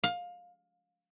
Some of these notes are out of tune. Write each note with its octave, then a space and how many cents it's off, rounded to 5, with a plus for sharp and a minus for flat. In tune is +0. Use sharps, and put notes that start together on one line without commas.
F5 +20